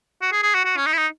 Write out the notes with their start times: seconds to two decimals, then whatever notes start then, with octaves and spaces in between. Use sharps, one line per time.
0.22 F#4
0.32 G#4
0.43 G#4
0.54 F#4
0.65 F#4
0.77 C#4
0.86 D#4
0.93 E4
0.97 D#4